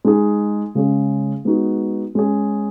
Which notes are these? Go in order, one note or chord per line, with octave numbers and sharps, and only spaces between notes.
G#3 D#4 G#4
C#3 G#3 C#4 G#4
G#3 B3 D#4 F#4
G#3 C#4 G#4